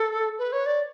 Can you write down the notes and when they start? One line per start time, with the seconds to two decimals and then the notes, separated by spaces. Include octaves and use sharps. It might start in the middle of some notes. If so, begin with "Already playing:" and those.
Already playing: A4
0.38 B4
0.52 C#5
0.66 D5